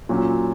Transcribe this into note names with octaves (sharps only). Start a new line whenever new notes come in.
A#2 F#3 C#4